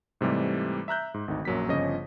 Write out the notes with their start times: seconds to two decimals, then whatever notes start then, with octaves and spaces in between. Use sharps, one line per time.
0.21 G#2 C3 E3 G3 A3
0.88 E5 A#5 F#6 G6
1.14 G#2
1.28 G#1 D2 D#4
1.45 A#1 F#2 F#3 A#3 B6
1.69 G1 C#3 F3 C#4 C#5 D#5